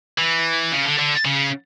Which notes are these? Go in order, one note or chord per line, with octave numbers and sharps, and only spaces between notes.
E3
C#3
D3
D3
C#3